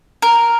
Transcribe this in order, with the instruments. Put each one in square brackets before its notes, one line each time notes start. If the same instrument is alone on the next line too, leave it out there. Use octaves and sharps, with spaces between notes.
[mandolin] A#4